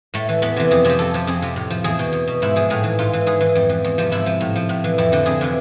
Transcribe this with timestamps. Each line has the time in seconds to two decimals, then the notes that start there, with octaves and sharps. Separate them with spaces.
0.14 A2 A3
0.29 E3
0.42 E2 B3
0.57 C3 E3
0.71 F2 G#4
0.85 C3 F3 G#4
0.99 F2 A4
1.14 C3 F3
1.27 F2 G#4
1.42 C3 F3
1.56 A2
1.70 F3
1.84 E2 G#4
1.99 B2
2.13 E2
2.27 B2
2.42 G#2 E4
2.56 F3 G#4
2.70 A2 G#4
2.84 E3
2.99 G#2 F4
3.13 E3
3.26 G#2 G#4
3.41 E3
3.55 F2
3.69 E3
3.84 E2
3.98 C3 F3
4.12 G#2 E4
4.26 F3
4.41 A2
4.56 F3
4.69 A2
4.84 E3
4.98 F2 E4
5.12 D3 F3
5.26 F2 G#4
5.41 C3 E3